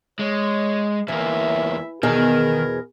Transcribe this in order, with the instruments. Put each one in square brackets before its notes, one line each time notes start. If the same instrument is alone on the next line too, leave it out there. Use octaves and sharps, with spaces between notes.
[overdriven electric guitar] G#3 [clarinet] C#5
[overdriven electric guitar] E2 A#3 [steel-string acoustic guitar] E3 [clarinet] E5
[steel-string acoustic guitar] E2 B2 G#4 [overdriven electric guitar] D#3 [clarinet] A#4